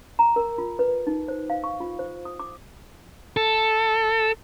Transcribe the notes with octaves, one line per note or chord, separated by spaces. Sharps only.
A#5
A#4
F4
B4
D#4
C5
F5
C#6
F4
C5
D#6
D6
A4